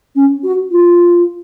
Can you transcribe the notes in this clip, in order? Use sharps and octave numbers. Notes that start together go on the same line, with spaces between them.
C#4
F#4
F4